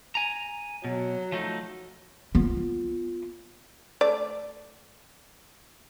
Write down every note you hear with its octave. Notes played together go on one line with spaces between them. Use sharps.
G#5 A#5
B2 F#3
F3 A3 D#4
B3 F4
A3 D5